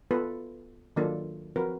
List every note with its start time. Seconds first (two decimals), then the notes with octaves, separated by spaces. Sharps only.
0.11 B3 F4 A4 B4
0.96 D#3 F#3 A#3 D4 F4 A4
1.56 F3 C4 F#4 A#4 B4